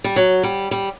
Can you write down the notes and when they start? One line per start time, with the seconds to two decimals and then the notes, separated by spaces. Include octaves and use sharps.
0.04 G3
0.16 F#3
0.43 G3
0.71 G3